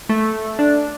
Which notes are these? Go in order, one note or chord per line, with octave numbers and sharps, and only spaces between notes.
A3
D4